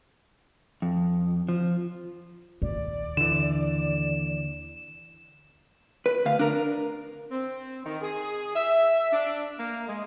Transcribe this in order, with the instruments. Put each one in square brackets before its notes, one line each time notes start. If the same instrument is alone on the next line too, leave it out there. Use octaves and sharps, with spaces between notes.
[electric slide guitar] F2
F3
[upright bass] D#2 A#2 [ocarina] D5
[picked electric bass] D3 E3 [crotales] E7
[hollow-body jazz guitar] B4
D2 F5
D4 A#4
[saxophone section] C4
D#3
G#4
E5
D4
A#3
G#3